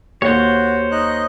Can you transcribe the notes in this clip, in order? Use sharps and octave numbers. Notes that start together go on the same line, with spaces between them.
D#2 F#4 C5 C#5
D#4 D#5 F#6